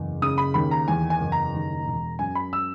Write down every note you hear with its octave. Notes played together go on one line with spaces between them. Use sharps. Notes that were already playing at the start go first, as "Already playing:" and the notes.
Already playing: F#1 E2
C#3 D#6
B5
D#2 B5
A#5
E2 G#5
G#5
F#1
A#5
D#2
E1
F#2 G#5
B5
E6